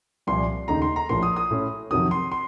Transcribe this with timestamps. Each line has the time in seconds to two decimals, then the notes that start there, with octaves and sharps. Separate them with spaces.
0.27 C2 A#2 F3 C6
0.68 D#2 C#3 A3 D#4 A#5
0.82 C6
0.96 A#5
1.09 A#1 A2 F3 A#3 C6
1.22 D#6
1.36 D#6
1.50 A2 A3 C#4
1.91 F2 C3 D#3 F#3 D#6
2.11 C6
2.32 C6